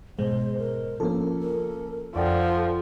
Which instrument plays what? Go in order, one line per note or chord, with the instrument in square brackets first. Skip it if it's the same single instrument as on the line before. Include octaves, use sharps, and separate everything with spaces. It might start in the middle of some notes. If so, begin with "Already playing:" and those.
[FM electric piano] G#2 B2 G#3 [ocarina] C5
[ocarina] A#4
[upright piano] F3 A#3 [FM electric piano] C#4 A4
[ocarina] A#4
[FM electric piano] F2 [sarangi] F3 [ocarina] A4 [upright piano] D5 F#5 G5